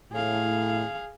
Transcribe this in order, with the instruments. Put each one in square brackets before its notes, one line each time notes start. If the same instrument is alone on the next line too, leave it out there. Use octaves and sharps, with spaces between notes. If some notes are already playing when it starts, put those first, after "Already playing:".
[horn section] A2 [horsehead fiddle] G#4 F5